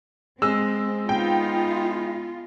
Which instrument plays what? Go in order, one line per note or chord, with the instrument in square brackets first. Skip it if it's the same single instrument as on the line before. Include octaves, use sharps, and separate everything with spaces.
[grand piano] G#3 [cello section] C4 [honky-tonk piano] E6
[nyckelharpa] B3 D#4 [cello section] F4 [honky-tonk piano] G5